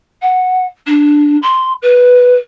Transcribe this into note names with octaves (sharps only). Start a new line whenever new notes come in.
F#5
D4
C6
B4